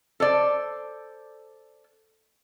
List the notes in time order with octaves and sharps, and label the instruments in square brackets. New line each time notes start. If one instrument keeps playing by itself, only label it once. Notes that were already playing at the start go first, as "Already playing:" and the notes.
[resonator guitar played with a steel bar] A4 C5 D5